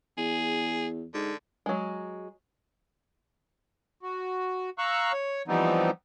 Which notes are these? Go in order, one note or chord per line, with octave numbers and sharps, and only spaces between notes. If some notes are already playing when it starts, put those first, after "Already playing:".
E2 G#4
G#2 D3
F#3 G#3
F#4
F5 A#5 C#6 E6 F#6
C#5
E3 F3 G3 B3 C4 D#4